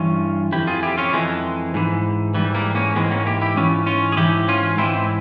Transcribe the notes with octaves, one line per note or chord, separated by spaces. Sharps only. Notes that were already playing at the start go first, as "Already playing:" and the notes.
Already playing: G2 E3 C#4 F4
F2 E3 E4 G4
F4 G#4
E4 G4
C#4 F4
F2 E3 G#3
G#2 E3
G#2 E3 G3
G3 A#3
A#3 C#4
G#2 E3 G#3 C4
A#3 C#4
E4 G4
E4 G4
G#2 E3 C#4 F4
C#4 F4
G#4
G#2 E3 E4 G4
C#4 F4
G#2 E3 C4 E4